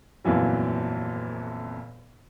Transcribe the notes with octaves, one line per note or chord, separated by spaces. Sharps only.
G1 F2 A#2 E3 F#3